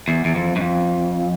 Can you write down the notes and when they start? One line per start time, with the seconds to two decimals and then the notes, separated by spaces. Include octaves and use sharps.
0.08 E2
0.25 E2
0.35 F2
0.56 F#2
0.61 F2